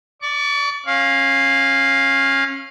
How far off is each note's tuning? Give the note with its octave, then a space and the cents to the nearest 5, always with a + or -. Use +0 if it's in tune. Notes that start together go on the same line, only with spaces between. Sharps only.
D5 +0 C#6 +40
C#4 -25 F5 +0